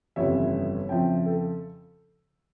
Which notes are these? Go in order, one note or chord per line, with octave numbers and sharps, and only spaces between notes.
G1 F2 C#3 E3 G3 C#5 E5
F2 C#3 F3 E5 G5
A4